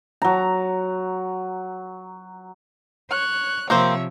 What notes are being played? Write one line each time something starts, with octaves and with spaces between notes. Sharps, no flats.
F#3 A#5
C#5 F#6
C3 F3 A#3 C4 C5 C#5 E5